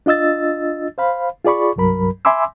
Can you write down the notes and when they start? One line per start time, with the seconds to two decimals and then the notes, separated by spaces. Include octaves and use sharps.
0.06 D4 F4 D#5 E6 A6
0.98 C5 F5 B5
1.44 F4 G#4 D5 B5 C#6
1.76 C2 G2 F#3 A#4 B5
2.25 E5 G#5 B5 C6 D6 E6